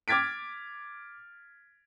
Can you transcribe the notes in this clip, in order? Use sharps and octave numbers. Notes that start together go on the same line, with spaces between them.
D6 F6 G#6 A6 B6 D7